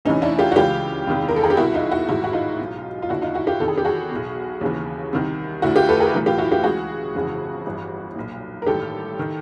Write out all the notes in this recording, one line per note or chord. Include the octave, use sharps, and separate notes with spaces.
D2 C3 E3 C#4 D#4
D4 E4
F4 G4
F#4
C#2 C#3 E3 F4 G4
E2 C3 D#3
A#4
A4
G#4
G4
C2 B2 E4 F#4
D#4 F4
E4 F#4
A1 G#2 D#3 E4 F#4
F#4
D#4 F4
B1 B2
F4
D#2 D3 E4 F#4
D#4 F4
E4 F#4
F4 G4
E2 C3 D#3 A4
G#4
G4
F#4 G#4
B1 B2
D#2 C#3 E3
C2 C3 D#3
D2 D3 E4 F#4
F4 G4
A4 B4
G#4 A#4
B1 A2 E3
F4 G4
E4 F#4
F4 G4
C#2 C#3 E3 F#4 G#4
G1 F2 C#3 E3
G1 G2 E3
B1 A#2
A#4
A1 G2 D#3 G4 A4
D#3